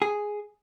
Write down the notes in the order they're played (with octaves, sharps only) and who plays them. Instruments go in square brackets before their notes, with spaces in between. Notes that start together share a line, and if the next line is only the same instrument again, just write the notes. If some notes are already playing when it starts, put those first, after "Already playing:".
[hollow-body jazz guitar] G#4